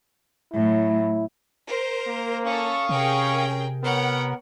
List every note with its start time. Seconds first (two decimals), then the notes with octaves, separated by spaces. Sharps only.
0.54 A2 F#3 E4
1.66 A#4 C5
2.07 A#3
2.45 C#4 A4 F5 C#6 D#6
2.89 C3 C#4 G#4 A#4 G5
3.83 B3 A#4 C#5 F#5 G5